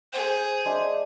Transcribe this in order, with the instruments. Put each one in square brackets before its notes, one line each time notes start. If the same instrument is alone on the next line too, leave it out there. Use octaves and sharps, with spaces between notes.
[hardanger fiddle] G#4 [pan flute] C5
[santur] G#3 D4 E5